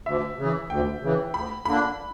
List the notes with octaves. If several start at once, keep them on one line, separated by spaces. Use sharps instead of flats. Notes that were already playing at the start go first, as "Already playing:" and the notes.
D2 E5
C#3 E3
D2 G5
C#3 E3
D2 B5
D3 A#3 D4 B5